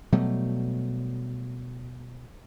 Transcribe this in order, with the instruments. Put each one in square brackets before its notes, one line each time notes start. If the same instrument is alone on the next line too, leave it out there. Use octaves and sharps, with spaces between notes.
[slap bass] B2 F#3 G3 A3